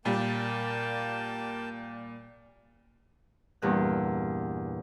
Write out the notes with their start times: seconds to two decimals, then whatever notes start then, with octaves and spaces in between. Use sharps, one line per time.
0.05 A#2 G3 A#3 G5 A5
3.62 E2 G2 A#2 F#6